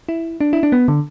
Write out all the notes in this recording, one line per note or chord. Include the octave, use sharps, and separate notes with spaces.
E4
D4
E4
D4
B3
D3